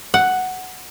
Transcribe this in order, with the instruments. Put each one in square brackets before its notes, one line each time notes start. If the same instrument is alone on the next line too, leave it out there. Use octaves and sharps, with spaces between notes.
[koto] F#5